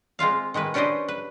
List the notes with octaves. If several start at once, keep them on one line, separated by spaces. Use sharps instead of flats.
G#3 C4 F4 F5
D#3 G#3 E4 B4
C#4 D4 G4 B4 C5 D#5
B4